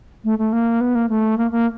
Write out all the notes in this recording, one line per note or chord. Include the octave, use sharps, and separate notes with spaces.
A3
A3
A#3
B3
A#3
A3
A#3
A#3